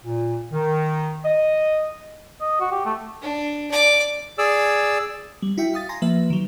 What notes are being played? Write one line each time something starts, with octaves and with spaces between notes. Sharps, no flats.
A#2
D#3
D#5
D#5
F#4
G4
A3
D4
D5 D6
G#4 D5 E6
G3
E4 F#4 E5 G5
F5 D#6 A6
G#5 A#5 C6 A#6
F3 A#3 B4 E5
D#3 F#3